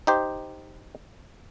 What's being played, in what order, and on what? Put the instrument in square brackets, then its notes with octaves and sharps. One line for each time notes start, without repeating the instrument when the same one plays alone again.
[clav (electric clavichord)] D#4 G4 C5